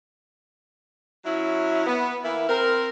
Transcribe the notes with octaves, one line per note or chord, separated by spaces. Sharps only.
F#3 C#4 E4
B3
E3 A#3 E4
C4 A#4